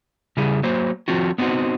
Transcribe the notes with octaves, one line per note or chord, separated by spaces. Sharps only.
C#3 G3 E4 G#4
F#3 A#3 C5
F3 C4 F4 F#4
B3 C4 D#4 F#4